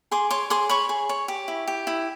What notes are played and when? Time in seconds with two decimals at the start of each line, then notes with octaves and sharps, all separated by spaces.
0.11 G#4 C6 D6
0.30 C#5 C6 D6
0.50 G#4 C6 D6
0.69 C#5 B5 C#6
0.89 G#4
1.09 C#5
1.28 G4
1.48 E4
1.68 G4
1.87 E4